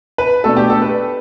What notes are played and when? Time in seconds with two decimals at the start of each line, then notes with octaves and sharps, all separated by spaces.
0.18 B4
0.44 B2 A3 D4 A4
0.57 G4
0.70 A4
0.82 B4